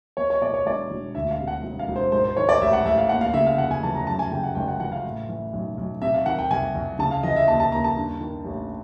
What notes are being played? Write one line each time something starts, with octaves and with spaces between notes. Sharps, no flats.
E2 C#5
C#5
B2 D5
C#5
E1 D5
E1
D2 E5
F5
C3
F#5
E1
F5
E1
C5
G#2 C5
C5
D#3 C#5
D5
A1 E5
F#5
A1 E5
F5
D#2 F#5
F5
C#3 E5
F5
F1 F#5
G#5
E3 A5
A#5
F#2 A5
G#5
C#3 G5
F#5
G#1 G5
F#5
E3 F#5
F5
A2
E3
B1
B1
C3 E5
F5
D#3 F#5
G5
C2 G#5
C2
C#3 A5
F5
E3 D#5
E5
D#2 A5
A5
D#2 A#5
A5
G2
D#3
A1